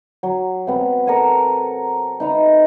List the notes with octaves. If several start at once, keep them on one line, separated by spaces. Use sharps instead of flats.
F#3
C3 B3
A4 A#4 F#5 G#5
D#4 B4 E5 A#5